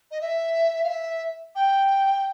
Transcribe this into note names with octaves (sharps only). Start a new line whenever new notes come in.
D#5
E5
F5
E5
G5